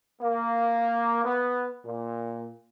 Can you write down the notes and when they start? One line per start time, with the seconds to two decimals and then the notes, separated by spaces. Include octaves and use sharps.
0.22 A#3
1.25 B3
1.85 A#2